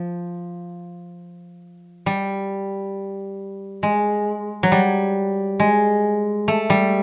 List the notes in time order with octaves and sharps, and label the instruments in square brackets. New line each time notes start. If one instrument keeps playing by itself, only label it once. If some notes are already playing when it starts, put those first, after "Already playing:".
Already playing: [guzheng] F3
G3
G#3
F#3
G3
G#3
A3
G3